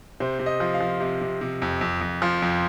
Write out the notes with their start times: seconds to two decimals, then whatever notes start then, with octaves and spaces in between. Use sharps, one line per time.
0.20 C3 C5
0.39 C3
0.46 D#5
0.60 F3
0.74 F5
0.80 F3
1.00 C3
1.21 C3
1.41 C3
1.62 F2
1.81 F2
2.01 F2
2.22 F3
2.42 F2